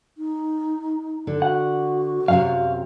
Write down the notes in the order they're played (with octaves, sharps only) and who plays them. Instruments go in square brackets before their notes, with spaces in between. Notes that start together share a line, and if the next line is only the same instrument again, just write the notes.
[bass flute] D#4
[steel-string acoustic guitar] D3
[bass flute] F#4 [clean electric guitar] F#5
[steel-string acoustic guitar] F#2 A2 C3 [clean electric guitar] F5